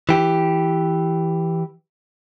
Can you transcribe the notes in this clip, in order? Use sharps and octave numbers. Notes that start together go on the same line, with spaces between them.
E3 G4